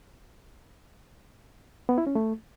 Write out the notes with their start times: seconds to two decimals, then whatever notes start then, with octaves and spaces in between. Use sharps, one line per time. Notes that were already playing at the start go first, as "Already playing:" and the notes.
1.89 B3
1.98 E4
2.07 C#4
2.15 A3